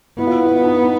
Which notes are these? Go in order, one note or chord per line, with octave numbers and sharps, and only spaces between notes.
B3 E4
F4
E4
F4
E4
D#4
D#4